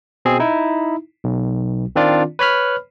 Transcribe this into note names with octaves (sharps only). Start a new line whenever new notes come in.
B2 C4 G#4
D#4 E4
B1
D#3 C4 D4 F4 D5
B4 C#5 B5 F6